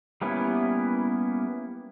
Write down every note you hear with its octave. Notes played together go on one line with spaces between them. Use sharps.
G3 A#3 B3 C#4 E4